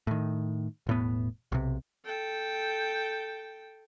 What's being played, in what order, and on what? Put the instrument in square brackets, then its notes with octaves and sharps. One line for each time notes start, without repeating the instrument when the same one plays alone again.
[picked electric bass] A2 D#3
E1 A2 B3
B1 C3
[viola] A4 G5